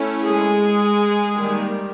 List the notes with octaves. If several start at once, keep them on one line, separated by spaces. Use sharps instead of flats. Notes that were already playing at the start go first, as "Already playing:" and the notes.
Already playing: A3 C#4 E4
G#3 G#4
D#3 G3 A#3